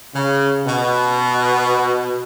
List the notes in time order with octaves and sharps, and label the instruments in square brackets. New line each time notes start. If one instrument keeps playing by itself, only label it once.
[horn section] C#3
B2